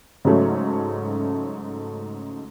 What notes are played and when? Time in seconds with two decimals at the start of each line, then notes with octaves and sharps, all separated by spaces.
0.25 G#2 C#3 F#3 A3 C#4